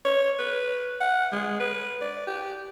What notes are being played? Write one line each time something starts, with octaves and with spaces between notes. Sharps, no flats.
C#5
B4
F#5
G#3
B4
D5
G4